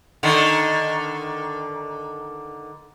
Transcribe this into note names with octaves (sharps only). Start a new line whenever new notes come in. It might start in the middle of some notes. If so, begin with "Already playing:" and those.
D3 D#3